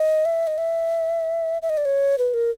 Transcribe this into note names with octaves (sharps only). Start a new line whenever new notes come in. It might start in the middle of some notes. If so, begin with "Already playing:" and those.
Already playing: D#5
E5
D#5
E5
E5
D#5
D5
C#5
B4
A#4